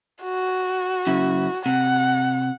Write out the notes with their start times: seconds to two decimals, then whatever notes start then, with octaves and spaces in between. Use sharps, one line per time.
0.22 F#4
1.07 F#2 C#3 E4
1.66 C3 F#5